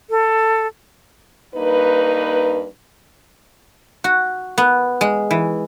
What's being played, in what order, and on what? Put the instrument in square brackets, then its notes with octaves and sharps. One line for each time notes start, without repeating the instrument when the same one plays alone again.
[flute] A4
[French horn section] G2 A#3 D#4 B4
[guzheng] F#4
B3
G#3
E3